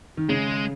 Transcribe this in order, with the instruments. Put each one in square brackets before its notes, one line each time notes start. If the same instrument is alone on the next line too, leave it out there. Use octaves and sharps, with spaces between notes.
[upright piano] D#3
[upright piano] C#3 [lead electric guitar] G#3